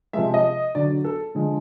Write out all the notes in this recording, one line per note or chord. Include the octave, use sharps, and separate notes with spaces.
C3 F3 G#3 E5
D#5
D3 F#3 D5
A4
D3 F3 G#3